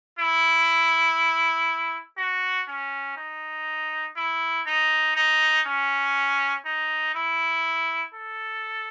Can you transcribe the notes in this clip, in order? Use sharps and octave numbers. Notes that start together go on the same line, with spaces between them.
E4
F#4
C#4
D#4
E4
D#4
D#4
C#4
D#4
E4
A4